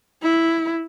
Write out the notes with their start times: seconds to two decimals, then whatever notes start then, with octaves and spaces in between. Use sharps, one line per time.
0.22 E4